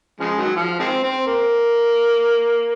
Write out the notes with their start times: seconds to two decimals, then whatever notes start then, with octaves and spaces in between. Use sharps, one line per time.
0.20 C#3 F3 G#3
0.38 D#3 F#3
0.56 F3
0.80 D#3 G#3 C4
1.04 C4
1.27 A#3